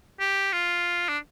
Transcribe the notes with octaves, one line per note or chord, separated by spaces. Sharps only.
G4
F4
D4